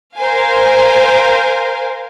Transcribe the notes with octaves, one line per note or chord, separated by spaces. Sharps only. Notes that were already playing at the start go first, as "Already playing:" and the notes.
A#4 C5 F5 G#5